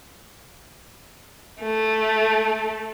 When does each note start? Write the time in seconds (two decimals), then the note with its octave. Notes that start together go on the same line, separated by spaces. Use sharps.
1.62 A3